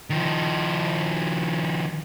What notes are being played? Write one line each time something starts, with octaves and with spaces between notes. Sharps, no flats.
D#3 F3